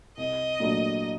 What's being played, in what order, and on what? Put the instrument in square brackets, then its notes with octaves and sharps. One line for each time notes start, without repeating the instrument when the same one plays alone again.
[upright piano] C2 [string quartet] D#5
[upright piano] A#2 F#3 A3 D4